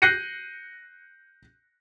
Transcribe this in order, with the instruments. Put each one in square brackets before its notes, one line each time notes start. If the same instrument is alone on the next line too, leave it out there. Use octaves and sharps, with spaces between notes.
[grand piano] F#6 G6 A#6 C7 C#7 D#7